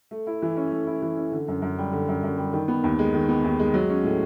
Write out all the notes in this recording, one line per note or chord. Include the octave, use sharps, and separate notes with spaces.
A3
E4
E3
C#4
A3
E4
E3
C#4
D3
F#2
F#2
G3
D3
F#2
F#2
G3
D#3
B3
D#2
G#3
D#3
B3
D#2
G#3
F#3
C#4
A2